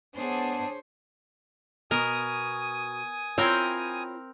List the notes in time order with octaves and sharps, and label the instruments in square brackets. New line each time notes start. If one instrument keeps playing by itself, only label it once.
[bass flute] B3 [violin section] D4 G#4 [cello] C5 C#5 [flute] A5
[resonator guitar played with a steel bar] B2 [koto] A#4 [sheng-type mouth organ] G#5 D#6
[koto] C4 A#4 G5 [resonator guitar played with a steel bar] E4 F4 C#5